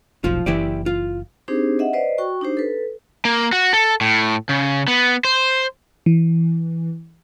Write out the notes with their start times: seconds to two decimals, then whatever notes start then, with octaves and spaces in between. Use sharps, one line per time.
0.24 F1 B1 F3 F4
0.46 F#1 E3 E4 G4 D5
0.86 F4
1.48 C4 D4 D#4 G4 G#4 C5
1.79 D#5 E5 F#5
1.93 B4 C5 D5 D#5
2.18 F#4 G5 C#6
2.41 D4 D#4 G4 C5
2.57 A4 B4
3.25 A#3
3.53 F#4
3.73 A4
4.01 A2
4.49 C#3
4.88 B3
5.25 C5
6.06 E3